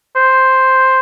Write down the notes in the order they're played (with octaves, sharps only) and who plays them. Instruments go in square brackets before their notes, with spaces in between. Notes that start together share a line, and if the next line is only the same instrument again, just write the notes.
[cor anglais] C5